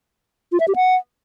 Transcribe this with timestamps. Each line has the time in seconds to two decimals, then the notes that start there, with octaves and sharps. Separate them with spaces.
0.52 F4
0.60 E5
0.68 G4
0.76 F#5